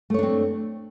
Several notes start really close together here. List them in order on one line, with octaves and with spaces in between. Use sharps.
A3 C#5 D4 C4